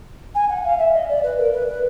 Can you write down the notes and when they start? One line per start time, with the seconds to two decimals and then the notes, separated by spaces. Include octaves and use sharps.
0.35 G#5
0.49 F#5
0.64 F5
0.79 E5
0.94 D#5
1.09 D5
1.23 B4
1.38 A#4
1.53 B4
1.68 B4